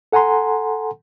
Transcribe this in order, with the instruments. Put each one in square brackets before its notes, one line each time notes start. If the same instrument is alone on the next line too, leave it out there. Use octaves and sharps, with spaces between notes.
[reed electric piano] A4 F#5 G#5 A#5 C6